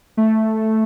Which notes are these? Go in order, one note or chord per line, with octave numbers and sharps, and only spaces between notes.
A3